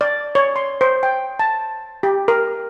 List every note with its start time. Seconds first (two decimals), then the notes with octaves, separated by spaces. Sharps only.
0.01 D5
0.35 C#5
0.56 C6
0.81 C5
1.03 G5
1.39 A5
2.03 G4
2.28 A#4